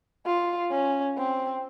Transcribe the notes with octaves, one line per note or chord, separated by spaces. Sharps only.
F4
C#4
C4